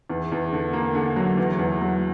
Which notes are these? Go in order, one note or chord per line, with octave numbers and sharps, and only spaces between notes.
E2
E2
D3
A#3
D3
F#3
E2
E2
F#3